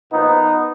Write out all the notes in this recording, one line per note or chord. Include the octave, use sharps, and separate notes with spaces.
A#2 F3 B3 D#4